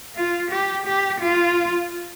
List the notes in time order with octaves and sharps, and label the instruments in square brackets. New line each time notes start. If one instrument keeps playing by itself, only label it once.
[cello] F4
G4
G4
F4